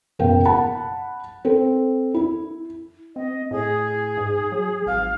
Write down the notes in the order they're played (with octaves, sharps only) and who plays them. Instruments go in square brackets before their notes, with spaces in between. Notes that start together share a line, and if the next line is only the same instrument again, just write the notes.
[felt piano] F#1 B2 A#4 F5 G5
F#5 A5 B5
C4 A4
E4
[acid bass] C4 [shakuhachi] D#5
[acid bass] A2 [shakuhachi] G#4
[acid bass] G#2
F#3
[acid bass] G#1 [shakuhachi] F5